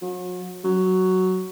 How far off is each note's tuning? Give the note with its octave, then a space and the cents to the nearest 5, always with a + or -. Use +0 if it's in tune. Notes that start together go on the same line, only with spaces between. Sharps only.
F#3 -40
F#3 +5